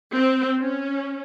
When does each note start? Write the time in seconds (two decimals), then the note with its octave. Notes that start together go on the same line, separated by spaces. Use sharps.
0.14 C4
0.59 C#4